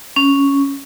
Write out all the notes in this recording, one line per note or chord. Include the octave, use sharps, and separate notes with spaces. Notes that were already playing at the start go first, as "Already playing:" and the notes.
C#4